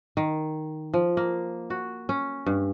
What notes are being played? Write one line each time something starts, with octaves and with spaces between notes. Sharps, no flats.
D#3
F3
A#3
F#4
C#4
G2